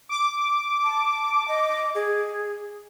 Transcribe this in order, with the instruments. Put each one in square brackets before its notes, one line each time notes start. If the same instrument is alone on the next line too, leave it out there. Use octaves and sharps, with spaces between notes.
[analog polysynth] D6
[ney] A5
D#5
G#4